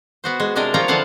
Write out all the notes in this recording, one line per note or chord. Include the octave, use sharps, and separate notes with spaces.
B3 F#4 C5
G#3
C3 G#3 D4 A#4 D#5
F3 A#3 F4 C#5 G5 A#5
D3 E3 F3 F5 F#5 A5